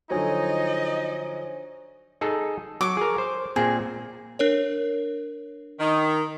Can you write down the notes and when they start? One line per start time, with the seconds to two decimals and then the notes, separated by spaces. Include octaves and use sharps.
0.10 D3 F3 F#3 D#4 C5 C#5 D#5 G#5
2.21 D#4 G#4 A4
2.81 F#3 C#6 D6
2.97 G#4 A#4
3.18 C5
3.56 A#2 A#3 C4 G#4
4.39 D4 A#4 C#5
5.79 D#3